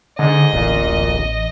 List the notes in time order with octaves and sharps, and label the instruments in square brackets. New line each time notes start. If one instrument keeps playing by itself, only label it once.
[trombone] G#2 [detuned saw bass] D3 [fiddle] D#5
[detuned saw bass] D1 [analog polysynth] A1 [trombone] A#2